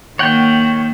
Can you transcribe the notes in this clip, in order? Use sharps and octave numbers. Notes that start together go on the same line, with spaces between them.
D#3 A#3 C#5 F#5 G5